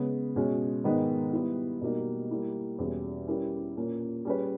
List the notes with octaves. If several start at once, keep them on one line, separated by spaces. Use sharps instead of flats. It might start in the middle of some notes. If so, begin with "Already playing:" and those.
Already playing: C#3 G#3 B3
B2 G#3 C#4 G#4
G#2 D#3 G#3 B3 D#4
G3 B3 E4
B2 G3 A#3 D#4
G3 A#3 E4
E2 B2 G3 C#4 G#4
G3 C#4 E4 G4 A#4
A#2 A#3 C#4
G3 C#4 G#4 B4